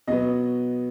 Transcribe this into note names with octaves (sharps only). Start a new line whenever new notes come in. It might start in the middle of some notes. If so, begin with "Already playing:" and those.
B2 F#3 B3 D#5